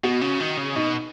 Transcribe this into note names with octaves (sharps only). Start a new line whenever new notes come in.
B2 F#4
C#3
D#3
C#3
B2 D#4